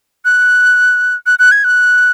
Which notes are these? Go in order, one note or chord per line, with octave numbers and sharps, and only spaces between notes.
F#6
F#6
F#6
G#6
F#6